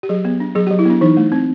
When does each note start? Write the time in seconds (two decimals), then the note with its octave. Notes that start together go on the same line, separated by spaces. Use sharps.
0.03 G4
0.09 F#3 G#4
0.25 B3
0.40 D4
0.55 F#3 G#4
0.67 G4
0.71 F#3
0.79 E4
0.85 B3 D4
1.01 E3 D#4
1.17 A3
1.32 C4